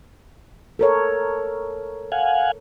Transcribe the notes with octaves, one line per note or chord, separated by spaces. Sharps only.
A4 A#4 C#5
F5 F#5 G#5